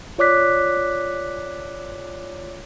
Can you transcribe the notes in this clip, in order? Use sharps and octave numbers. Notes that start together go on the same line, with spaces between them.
F4 C#5 D5 D6 F#6 B6